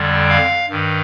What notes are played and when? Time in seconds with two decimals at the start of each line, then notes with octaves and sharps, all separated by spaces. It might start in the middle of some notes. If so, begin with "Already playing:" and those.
Already playing: F2 D3 G3
0.29 F5
0.69 G2 D#3